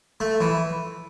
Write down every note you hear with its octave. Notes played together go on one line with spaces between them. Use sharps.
A3
E3